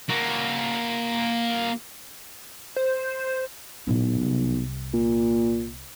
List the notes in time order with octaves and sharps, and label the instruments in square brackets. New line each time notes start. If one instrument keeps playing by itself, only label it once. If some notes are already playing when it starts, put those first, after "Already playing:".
[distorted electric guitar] A#3 F#4
[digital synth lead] C5
[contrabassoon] B1 [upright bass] A#2 E4
[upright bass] C2
[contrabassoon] A#2